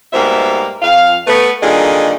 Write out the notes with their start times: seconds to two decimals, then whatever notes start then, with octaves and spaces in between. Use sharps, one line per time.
0.13 G#2 B2 G3 A#3 C5 E5
0.82 F2 F5
1.27 A3 B3 B4
1.63 A#2 D3 D#3 G3 G#4 D#5